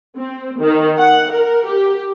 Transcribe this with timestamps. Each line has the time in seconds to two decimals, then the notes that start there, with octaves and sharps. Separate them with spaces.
0.17 C4
0.60 D#3
0.98 F#5
1.31 A#4
1.67 G4